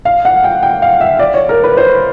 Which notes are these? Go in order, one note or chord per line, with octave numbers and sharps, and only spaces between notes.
F5
F#5
G5
G5
F5
E5
D5
C#5
A#4
B4
C5